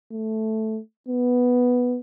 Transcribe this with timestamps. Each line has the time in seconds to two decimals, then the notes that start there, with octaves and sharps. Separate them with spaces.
0.12 A3
1.08 B3